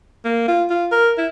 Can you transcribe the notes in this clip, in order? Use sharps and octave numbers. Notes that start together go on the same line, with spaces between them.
A#3
F4
F4
A#4
E4